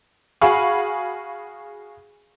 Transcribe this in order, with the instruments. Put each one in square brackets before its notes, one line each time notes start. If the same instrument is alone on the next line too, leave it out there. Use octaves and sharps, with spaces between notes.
[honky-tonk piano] F#4 G#4 F5 G#5 B5 C#6